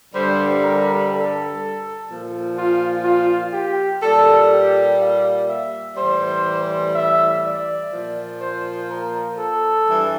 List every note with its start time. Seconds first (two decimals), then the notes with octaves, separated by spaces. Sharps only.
0.13 G2 D3 G3 C5
0.62 A#4
1.11 A4
2.08 A#2 F3
2.57 F4
3.05 F4
3.54 G4
4.02 A#2 G3 A4
4.52 G4
5.00 F5
5.49 E5
5.97 A2 E3 G3 C5
6.95 E5
7.44 D5
7.92 A#2 F3
8.40 C5
8.90 A#4
9.38 A4
9.87 G2 E3